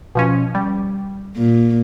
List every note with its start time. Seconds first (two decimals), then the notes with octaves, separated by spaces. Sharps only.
0.15 B2 F3 C#4
0.55 G3
1.37 A#2